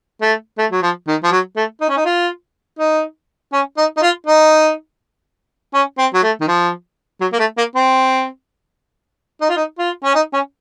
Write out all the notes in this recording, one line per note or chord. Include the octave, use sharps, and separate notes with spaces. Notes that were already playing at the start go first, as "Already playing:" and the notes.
A3
A3
F#3
F3
D#3
F3
F#3
A3
D#4
C#4
D#4
F4
D#4
C#4
D#4
D#4
F4
D#4
C#4
C4
F#3
A3
D#3
F3
F#3
A#3
A3
A#3
C4
D#4
F4
D#4
F4
C#4
D#4
C#4